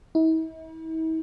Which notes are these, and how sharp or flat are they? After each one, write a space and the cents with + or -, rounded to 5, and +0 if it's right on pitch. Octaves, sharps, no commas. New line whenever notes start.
E4 -45